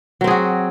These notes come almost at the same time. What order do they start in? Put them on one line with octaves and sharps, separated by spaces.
F#3 C4 G#4 F#4